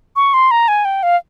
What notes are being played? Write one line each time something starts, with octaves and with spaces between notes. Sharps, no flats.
C#6
C6
A#5
G#5
G5
F5